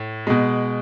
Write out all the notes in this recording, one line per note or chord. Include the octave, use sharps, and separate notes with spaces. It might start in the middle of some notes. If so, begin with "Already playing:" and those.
Already playing: A2
B2 G#3